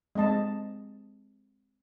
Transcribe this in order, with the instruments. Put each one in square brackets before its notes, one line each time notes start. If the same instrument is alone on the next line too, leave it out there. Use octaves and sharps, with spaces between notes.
[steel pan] G#3 C4 D#5 A5